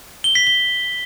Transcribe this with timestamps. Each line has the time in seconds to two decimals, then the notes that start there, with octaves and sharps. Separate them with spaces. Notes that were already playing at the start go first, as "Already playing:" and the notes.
0.24 G7
0.35 B6
0.47 G7